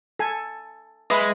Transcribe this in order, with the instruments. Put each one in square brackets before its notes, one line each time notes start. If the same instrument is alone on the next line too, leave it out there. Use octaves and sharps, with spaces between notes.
[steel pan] A4 G#5
[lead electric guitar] G#3 [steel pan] B4 E5 B5